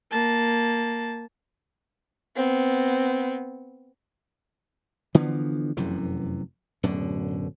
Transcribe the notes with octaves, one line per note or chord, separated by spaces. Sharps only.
A#3 A5
B3 C4
D3 E3 F3 B3
F1 F#2 C3 E3
D1 F#2 B2 D3